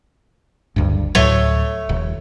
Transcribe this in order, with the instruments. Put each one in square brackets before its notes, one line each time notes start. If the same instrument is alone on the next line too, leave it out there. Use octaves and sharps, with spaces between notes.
[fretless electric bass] F#1 D2 G2
[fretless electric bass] D2 A2 F#3 [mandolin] A3 C#5
[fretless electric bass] D#1